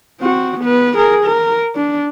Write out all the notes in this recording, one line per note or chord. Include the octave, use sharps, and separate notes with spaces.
C4 F#4
B3 B4
G#4 A#4
A#4
D4